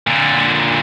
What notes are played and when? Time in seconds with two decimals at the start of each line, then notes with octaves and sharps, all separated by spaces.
0.07 A#2 D3